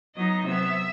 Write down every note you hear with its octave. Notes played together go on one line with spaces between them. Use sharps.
F#3 B3 D#4 D#5
C3 F#3 B3 E5